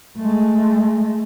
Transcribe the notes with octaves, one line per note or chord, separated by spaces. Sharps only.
G#3 A3